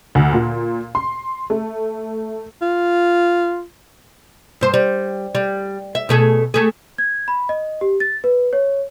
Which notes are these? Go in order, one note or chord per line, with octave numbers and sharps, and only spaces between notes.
D2
A#2
C6
A3
F4
G2 C5
G3
G3
E5
B2 A3 G#4
A3 G#4
G#6
B5
D#5
G4
A6
B4
C#5